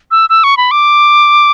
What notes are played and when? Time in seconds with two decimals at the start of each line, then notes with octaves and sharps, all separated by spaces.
0.11 E6
0.30 E6
0.44 C#6
0.57 B5
0.71 D6